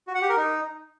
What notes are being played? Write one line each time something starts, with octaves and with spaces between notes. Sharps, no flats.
F#4
F#5
G4
A#4
D#4